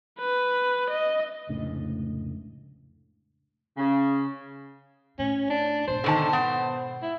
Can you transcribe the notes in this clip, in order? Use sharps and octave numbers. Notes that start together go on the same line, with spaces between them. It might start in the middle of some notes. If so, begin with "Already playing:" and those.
B4
D#5
F1 C#2 A2 D4
C#3
A2 C#4
D4
G#2 B2 C5
D3 D#3 A5
B3
E4